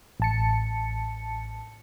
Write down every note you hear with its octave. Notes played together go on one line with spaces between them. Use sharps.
A1 A5 C#7